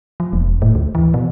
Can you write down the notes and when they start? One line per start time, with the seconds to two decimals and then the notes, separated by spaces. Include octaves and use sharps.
0.20 F3
0.33 E1
0.62 A2
0.75 D2
0.95 E3
1.14 B2